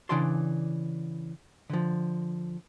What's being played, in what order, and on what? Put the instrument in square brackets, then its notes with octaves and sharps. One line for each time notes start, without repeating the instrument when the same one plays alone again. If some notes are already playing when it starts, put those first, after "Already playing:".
[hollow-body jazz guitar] C#3 E3 D4 D5 A5 C6
D3 F3